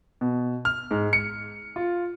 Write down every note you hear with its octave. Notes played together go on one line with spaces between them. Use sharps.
B2
F6
G#2
C#7
F4